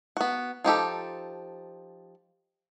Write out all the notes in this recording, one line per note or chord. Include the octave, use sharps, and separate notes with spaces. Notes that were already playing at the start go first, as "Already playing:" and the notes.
B3 F#4
F3 D#4 G4 A4